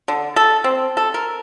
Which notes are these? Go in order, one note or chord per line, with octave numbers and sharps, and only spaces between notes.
D3
A4
C4
A4
A#4